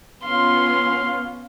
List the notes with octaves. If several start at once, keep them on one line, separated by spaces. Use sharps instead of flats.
B3 C#4 F4 F5 C6